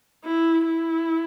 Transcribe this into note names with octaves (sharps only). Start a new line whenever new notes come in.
E4
E4